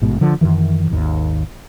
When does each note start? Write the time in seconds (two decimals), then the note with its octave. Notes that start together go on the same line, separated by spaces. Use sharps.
0.02 A1 G#2 B2
0.21 D3 F3
0.41 F#2 C3 D#3 E3
0.91 G#1 D#2